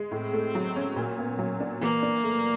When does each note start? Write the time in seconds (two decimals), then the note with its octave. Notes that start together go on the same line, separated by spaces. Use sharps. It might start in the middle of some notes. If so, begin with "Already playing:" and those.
Already playing: G#3
0.12 A2 C4
0.33 A3
0.55 F#3
0.76 C#4
0.96 A#2
1.19 B3
1.39 F#3
1.60 D4
1.81 E3 A#3
2.03 D4
2.24 A3